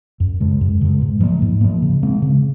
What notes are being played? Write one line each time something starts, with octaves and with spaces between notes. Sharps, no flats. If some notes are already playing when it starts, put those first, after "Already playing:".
F#2
C#3 G#3
F#2
C#3 G#3
G#2
F3 A#3
G#2
F3 A#3
C#3
G#3 C4
C#3